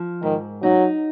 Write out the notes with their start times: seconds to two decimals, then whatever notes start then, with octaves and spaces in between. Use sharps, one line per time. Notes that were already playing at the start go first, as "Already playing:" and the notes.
Already playing: F3
0.22 G#2 D#3
0.62 F#3 D#4